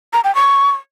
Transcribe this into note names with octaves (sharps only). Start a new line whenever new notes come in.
A#5
G5
C#6